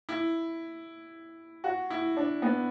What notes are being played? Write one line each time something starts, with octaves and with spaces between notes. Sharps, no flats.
E4
F#4
E4
D4
B3